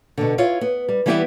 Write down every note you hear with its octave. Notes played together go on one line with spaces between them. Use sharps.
B2 D3
E4 F4 C#5
B3
G3
E3 G3 B3 E4 F#4 G4